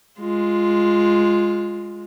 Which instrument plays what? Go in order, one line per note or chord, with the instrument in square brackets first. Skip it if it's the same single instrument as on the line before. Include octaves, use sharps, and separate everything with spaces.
[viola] G#3 F4